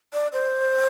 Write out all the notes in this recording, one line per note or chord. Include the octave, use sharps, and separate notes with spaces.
D5
C5